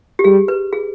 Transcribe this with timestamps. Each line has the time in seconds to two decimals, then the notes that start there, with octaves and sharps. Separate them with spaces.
0.19 G4
0.24 G3 G#4
0.48 B4
0.73 G#4